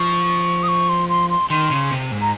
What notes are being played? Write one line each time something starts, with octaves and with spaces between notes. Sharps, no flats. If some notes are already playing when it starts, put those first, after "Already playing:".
Already playing: F3 C#6
D#6
C#6
C6
C6
C6
D#3 C6
C#3
C3
G#2
A#5